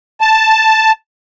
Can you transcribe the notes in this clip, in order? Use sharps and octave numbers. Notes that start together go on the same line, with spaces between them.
A5